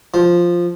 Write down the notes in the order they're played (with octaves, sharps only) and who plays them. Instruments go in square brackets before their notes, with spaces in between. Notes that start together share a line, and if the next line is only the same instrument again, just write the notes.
[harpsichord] F3